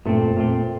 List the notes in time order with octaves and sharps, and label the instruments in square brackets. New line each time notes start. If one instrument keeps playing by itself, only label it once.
[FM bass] G2 [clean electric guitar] A#2 A3 C4
[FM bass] F2
[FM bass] F2 [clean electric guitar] A#2 A3 C4